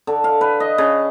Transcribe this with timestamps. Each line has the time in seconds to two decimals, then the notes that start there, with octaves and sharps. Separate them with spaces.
0.07 D3
0.24 F5
0.41 B4
0.60 D#5
0.78 C#3